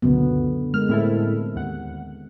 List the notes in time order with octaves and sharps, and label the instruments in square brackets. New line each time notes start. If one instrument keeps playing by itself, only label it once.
[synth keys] C#2 F#2 B2 [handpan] D3 B3
[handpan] G#3 A#4 [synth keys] F6
[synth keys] A2 E4 A4 [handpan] C4
[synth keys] D#2 F#5